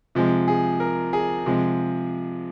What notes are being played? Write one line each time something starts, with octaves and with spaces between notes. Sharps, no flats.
C3 F3 G#3
G#4
A#4
G#4
C3 F3 G#3